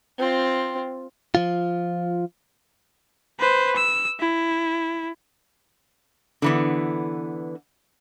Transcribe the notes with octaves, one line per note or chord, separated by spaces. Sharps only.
C4 F4
F3 F4
B4 C5
E6
E4
D3 E3 B3